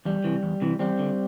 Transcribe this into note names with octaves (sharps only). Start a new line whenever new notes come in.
E2 G3
C3 E3
E2
C3 E3
E2 G3 C4
D3